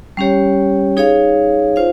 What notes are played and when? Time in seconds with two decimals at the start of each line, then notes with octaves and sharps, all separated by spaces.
0.17 G3 C#4 G4 C#5
0.97 D#4 G#4 C#5 F5
1.76 F4 C5 F5